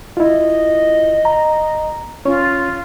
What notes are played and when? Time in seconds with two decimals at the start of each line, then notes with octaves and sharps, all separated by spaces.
0.17 E4 F4 D#5
1.25 A#5
2.25 C#4 F4 C#5